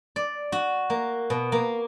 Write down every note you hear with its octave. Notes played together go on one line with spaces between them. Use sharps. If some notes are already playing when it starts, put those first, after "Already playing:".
D5
F#4
A#3
B2
A#3